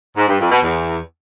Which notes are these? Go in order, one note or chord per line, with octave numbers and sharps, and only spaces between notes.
G#2
G2
F2
B2
E2